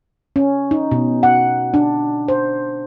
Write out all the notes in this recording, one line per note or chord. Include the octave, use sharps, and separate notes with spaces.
C#4
D#4
B2
F#5
D4
C5